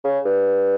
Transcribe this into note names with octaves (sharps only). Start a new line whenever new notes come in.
C#3
G2